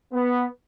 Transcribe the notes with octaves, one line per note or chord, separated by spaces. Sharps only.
B3